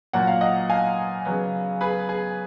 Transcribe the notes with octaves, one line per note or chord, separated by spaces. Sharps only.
A#2 F#3 A#3 F#5
F5
D#5 F#5
F5 G#5
C#3 F#3 B3
G#4 B4
G#4